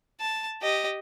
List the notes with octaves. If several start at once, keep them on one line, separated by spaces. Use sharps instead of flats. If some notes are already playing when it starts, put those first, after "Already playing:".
A5
G4 D#5